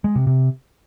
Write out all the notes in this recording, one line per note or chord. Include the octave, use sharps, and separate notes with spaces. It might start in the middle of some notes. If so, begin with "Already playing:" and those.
G#3
C3
C3